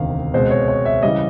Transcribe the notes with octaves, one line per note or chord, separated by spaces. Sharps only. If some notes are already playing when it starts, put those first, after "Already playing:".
Already playing: E1 D2 C3 D#3 F5
C#2 B2 G#3 C4 C5
C#5
C#5
E5
C#3 E3 G3 D#5